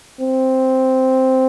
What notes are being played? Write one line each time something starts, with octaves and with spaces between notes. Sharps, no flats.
C4